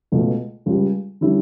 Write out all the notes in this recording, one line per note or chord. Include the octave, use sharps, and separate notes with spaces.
C#2 B2 A3
C#2 C#3 G3
D3 G3 C#4 E4